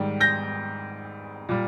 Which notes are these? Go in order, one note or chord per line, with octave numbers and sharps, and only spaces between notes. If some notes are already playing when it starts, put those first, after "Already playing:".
Already playing: G#2 D#3 G3
G6 A#6
A#2 G3